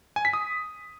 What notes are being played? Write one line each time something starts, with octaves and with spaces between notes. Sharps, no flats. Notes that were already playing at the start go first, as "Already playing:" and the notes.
G#5
B6
D#6